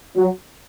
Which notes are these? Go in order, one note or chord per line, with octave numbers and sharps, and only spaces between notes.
F#3